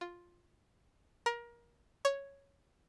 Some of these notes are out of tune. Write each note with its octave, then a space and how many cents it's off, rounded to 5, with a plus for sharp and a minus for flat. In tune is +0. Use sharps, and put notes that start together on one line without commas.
F4 +5
A#4 +25
C#5 +0